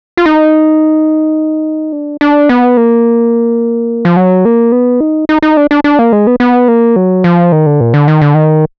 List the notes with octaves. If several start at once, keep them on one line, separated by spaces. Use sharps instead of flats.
F4
D#4
D4
D4
B3
A#3
F3
F#3
A#3
B3
D#4
D#4
D#4
D4
D4
D4
A#3
G#3
B3
B3
A#3
F#3
F3
D#3
D3
A#2
D3
D#3
D3
D#3